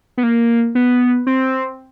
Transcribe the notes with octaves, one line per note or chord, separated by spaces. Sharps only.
B3
A#3
B3
C4